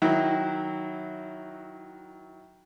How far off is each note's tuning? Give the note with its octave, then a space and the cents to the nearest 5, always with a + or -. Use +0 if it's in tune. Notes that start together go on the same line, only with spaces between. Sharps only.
D#3 +5 F#3 +0 E4 -15